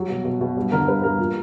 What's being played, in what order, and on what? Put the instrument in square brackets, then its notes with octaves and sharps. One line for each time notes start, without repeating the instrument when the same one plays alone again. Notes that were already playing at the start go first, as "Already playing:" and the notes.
Already playing: [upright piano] F#3 G3
B2
B2
B2
G2
D3 A#4
G2 B4
G2 A#4
A#2